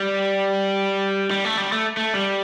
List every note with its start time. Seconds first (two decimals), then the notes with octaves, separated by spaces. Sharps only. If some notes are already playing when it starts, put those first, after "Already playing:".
Already playing: G3
1.31 G3
1.45 A3
1.58 G3
1.72 A3
1.97 A3
2.14 G3